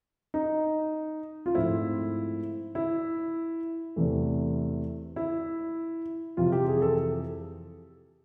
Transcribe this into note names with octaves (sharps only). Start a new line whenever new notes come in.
D#4
F4
G#2 F3 A3 C4 E4
E4
E2 C3 E3 A3
E4
F2 C3 E3 G3 F4
G4
G#4
A4